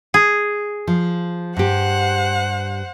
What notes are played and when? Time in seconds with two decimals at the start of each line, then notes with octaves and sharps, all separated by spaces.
0.14 G#4
0.87 F3
1.57 G2 G4 C5 F#5